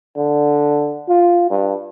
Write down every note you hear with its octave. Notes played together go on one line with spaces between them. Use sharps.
D3
F4
G2